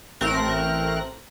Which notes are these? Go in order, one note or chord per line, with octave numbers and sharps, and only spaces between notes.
A1 A3 C4 A#4 F#6 A#6